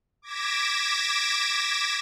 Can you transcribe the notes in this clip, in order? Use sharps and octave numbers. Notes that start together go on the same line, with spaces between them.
D6 G#6 A#6 B6 D7 E7